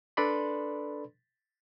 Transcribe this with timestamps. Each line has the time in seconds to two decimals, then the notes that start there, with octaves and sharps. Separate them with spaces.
0.17 D4 A4 B4 D5 B5 C6